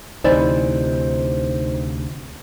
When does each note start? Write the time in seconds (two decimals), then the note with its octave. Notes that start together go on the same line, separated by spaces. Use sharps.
0.24 D2 C3 E3 D#4 C5 D5